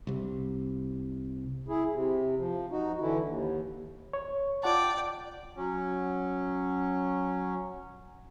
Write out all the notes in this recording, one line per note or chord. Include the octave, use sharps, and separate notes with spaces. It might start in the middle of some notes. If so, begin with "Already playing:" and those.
C2 C3
E4 G#4
C3
F3
D#4 F#4
D3 E3 E4
D#2
C#5
F4 D5 F#5 G5 A5
F#3 C#4